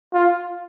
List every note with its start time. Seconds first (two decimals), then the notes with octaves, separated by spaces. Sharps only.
0.13 F4